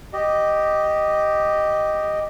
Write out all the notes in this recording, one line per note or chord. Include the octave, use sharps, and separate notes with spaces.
G4 D#5